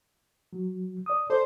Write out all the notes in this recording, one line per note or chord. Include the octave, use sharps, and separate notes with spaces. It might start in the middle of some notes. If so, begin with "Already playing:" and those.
F#3
D5 D#6
A4 C5 D5